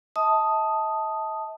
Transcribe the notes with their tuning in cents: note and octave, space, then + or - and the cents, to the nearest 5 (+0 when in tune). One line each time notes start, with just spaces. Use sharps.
D#5 +45 A5 +0 D#6 +0